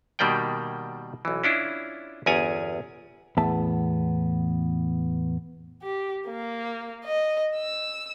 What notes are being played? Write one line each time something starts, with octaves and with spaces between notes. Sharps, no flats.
B2 D#3 G3 A#3 D5 G5
B1 E3
C#4 D4 E4 F4
G1 E2 C#4 D5 G#5 A#5
E2 A2 B3 E5 A5
G4
A#3
D#5
E6